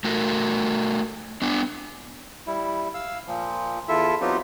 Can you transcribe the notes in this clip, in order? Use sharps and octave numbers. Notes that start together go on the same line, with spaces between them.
A3 F#4 A#4
B3 D4
G3 E4
F5 E6
A#2 F3
E2 E4 F4 A4 E5
F#3 B3 C4 D#4 F4 G4